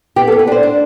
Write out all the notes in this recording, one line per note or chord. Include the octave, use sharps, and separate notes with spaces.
B3 G4
A4
B3
B4
D4 C5
D4